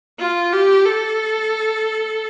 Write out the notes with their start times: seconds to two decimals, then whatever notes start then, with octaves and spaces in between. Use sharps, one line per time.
0.19 F4
0.53 G4
0.86 A4